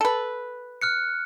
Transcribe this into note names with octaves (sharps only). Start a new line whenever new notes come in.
A4 B4
F6 F#6 C#7